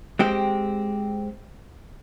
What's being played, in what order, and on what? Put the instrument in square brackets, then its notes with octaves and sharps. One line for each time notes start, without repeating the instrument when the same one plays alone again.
[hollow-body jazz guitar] G#3 C4 G4